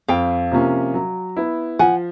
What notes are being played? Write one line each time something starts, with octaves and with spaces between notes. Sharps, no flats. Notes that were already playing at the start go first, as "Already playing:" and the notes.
F2 F5 G5
C3 F3 A#3 C#4
F#3
B3 E4
F3 F#5 G#5